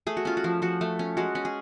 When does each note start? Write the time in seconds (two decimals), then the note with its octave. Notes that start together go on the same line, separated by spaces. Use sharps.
0.07 A3 G#4
0.17 F#4
0.25 C#4 F4
0.37 F#4
0.44 F3
0.62 F3 F#4
0.81 A3
0.99 C#4
1.17 G#3 F#4
1.35 C#4
1.45 G#4